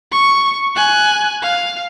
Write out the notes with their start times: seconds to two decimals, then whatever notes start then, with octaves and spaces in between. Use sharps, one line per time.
0.12 C#6
0.76 G#5 F#6
1.42 F5